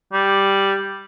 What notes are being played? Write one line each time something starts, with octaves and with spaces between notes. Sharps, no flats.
G3